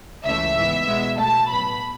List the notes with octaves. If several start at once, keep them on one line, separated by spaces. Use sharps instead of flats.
C#2 C#3 E3 A3 E5
G#2 E3 B3
B2 G#3 B3
B2 A3 A5
A2 F#3 B3 B5